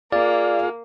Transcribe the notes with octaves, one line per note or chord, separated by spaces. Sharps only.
A#3 F4 G#4 D5 F5